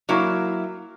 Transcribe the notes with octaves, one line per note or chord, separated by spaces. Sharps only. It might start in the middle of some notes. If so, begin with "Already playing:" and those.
F#3 A#3 E4